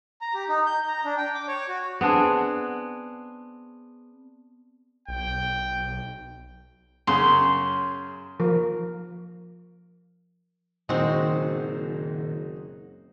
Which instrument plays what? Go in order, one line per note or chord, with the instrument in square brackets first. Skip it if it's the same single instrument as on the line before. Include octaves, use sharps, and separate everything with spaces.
[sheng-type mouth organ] A#5
G4
D#4
G6
A#5
D4
G5
D6
C#5
F#4
[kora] B3 C4 D4 G#4
[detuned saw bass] B1 [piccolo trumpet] G5
[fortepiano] F#2 C#3 [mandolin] C6
[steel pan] F3 A#4
[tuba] F#1 [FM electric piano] A#2 D#3 [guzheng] G#3 C4 [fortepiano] D#4 F#4 C5